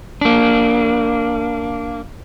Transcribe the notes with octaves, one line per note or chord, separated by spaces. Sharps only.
A#3 D4